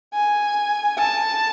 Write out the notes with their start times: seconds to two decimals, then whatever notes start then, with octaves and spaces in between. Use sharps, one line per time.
0.14 G#5
0.98 A5